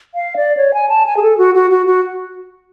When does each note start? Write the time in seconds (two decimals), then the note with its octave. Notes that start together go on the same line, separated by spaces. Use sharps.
0.15 F5
0.36 D5
0.57 C#5
0.74 G#5
0.89 A5
1.06 G#5
1.17 G#4
1.22 A4
1.38 F#4
1.55 F#4
1.71 F#4
1.86 F#4